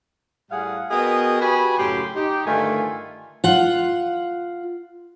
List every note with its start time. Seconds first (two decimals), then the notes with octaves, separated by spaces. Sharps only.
0.50 A2 G3 G#4 F5 F#5
0.90 B3 F#4 G#4 A#4 D#5 G5
1.41 F#4 G4 B4 G#5 B5
1.78 F#2 A2 C#3 G4 C6
2.16 D#4 G4
2.46 G2 D3 D#3 A3 F4 G#5
3.44 F4 F#5